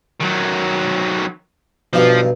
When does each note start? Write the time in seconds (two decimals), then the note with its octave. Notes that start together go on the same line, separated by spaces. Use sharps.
0.21 D#3 F#3
1.93 B1 G2 F3 F5